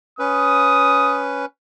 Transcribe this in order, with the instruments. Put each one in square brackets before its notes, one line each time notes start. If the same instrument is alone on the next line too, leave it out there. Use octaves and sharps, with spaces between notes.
[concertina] C#4 B4 [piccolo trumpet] D#6